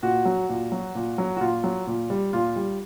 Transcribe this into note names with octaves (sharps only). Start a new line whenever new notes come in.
A#2 F#4
F#3
A#2
F#3
A#2
F#3
F#4
A#2 F4
F#3
A#2
G3
A#2 F4
G3